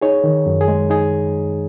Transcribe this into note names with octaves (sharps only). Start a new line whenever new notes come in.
D#4 G#4 C#5
D#3
F#2
G#4
G#3
D#4 G#4